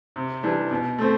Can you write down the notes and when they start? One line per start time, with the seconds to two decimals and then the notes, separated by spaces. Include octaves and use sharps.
0.16 C3
0.43 E3 G3 D4
0.71 B2
0.98 A3 C4